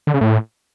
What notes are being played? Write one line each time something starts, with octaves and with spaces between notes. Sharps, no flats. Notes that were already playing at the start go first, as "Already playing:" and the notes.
D3
C#3
A2